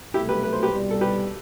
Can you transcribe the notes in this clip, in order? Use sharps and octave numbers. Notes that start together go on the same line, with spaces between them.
C2 B2 F#3 A3 E4 G4
G4 B4
B4
C5
G4 B4
C2 B2 G3
A4
G4 B4